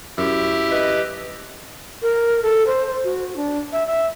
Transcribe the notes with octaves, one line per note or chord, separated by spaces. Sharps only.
F#2 E4 G4
B4 D#5
A#4
A4
C5
F#4
D4
E5
E5